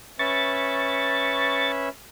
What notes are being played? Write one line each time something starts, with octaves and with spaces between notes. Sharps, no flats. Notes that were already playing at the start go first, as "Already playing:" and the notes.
C#4 B4 E5 C#6 A6